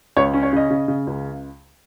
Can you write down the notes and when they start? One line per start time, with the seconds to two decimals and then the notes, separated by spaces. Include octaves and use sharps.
0.17 C#2 C#5
0.34 C#4
0.43 C#5
0.53 C#3 D#5
0.70 C#3
0.88 C#3
1.07 C#2